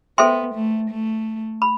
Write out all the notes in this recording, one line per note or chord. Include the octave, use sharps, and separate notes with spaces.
B3 A4 C5 E5 G5 C6
A3
A3
B5